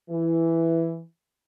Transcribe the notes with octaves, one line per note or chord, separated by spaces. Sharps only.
E3